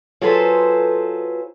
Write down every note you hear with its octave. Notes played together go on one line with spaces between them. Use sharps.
F#3 F4 G#4 A4 B4 C5